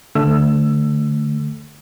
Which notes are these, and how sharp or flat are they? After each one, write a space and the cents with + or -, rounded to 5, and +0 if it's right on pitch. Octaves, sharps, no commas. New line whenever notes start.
D3 +5 A3 +0 E6 +20